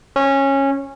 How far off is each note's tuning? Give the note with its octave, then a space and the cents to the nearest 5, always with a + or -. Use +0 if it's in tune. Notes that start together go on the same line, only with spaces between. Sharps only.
C#4 -15